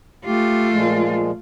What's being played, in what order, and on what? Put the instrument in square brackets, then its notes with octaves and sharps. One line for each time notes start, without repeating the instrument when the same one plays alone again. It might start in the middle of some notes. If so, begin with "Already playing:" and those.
[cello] A3 F4 [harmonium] G4
[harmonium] A#2 F3 G#3